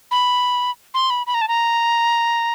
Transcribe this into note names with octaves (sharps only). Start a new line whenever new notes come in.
B5
C6
B5
B5
A#5
A5
A#5